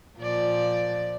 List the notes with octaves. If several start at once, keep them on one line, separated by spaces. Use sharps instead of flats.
A#2 F3 D5